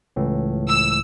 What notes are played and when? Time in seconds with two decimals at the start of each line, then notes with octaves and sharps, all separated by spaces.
0.16 C#2 A2 E3
0.69 E6